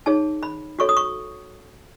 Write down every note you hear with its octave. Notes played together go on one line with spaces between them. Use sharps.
D#4 G#4 C#5 A5
B5
F#4 A4 C#5 C#6
D#6
C#6